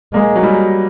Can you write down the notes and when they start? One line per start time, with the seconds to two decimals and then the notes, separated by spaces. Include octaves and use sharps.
0.14 G#3 A#3
0.36 F#3
0.43 G3